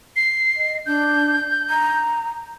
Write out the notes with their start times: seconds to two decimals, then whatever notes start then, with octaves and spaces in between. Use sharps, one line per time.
0.16 C7
0.56 D#5
0.86 D4 G6
1.70 A#5